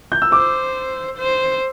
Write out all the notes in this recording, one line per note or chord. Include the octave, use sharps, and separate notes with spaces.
G6
E6
C5 D6
C5